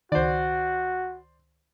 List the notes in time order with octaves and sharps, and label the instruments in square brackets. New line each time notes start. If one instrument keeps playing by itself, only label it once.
[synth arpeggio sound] C#2 D#3 [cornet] F#4 [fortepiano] C5 D5